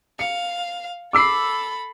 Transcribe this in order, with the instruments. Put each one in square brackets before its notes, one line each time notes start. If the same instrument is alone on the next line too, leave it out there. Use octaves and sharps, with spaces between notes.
[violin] F5 [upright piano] C#7
[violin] A4 B5 [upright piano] D6 E6 C7